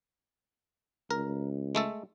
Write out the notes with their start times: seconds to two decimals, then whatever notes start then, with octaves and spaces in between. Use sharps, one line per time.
1.11 C#2 A#4
1.75 G#3 A3 A4